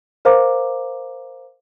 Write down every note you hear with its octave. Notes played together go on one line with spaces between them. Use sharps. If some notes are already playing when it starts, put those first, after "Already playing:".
A#4 C5 F5 A#5 D6